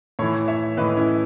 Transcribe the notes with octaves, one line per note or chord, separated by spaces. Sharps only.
A2 E3 A4 C#5
C#5 E5
A2 E3 B4 D#5
C#4 E4